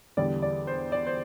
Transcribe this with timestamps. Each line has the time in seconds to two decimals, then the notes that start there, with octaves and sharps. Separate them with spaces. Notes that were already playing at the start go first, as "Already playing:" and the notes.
0.17 E2 D3 G3 D5
0.42 D5
0.67 C5
0.92 D5
1.06 C5